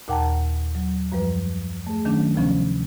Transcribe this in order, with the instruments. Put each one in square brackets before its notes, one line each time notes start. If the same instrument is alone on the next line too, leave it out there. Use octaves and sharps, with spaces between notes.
[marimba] D#2 A#2 F#5 G5 A5 A#5
F#3
F#2 F3 G3 B4
A3 G#4
D#3 F#3 A3 C#4 D4
D2 C3 F3 B3 C#4